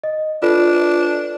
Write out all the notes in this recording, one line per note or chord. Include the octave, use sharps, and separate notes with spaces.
D#5
D4 F4 A4 B4